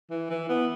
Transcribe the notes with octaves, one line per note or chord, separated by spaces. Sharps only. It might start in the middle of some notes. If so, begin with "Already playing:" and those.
E3
E3
B3